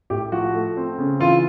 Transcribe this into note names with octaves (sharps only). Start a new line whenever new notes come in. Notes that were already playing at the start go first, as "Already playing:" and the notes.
A2 G4
F3 F#4
A3
C4
C#3
E3 F4